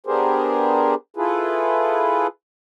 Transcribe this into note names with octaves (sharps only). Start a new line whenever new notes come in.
B3 D4 G4 G#4 A#4 C5
E4 F4 G#4 A4 B4